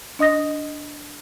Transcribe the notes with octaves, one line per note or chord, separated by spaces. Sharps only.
D4 D#5 D#6 A#6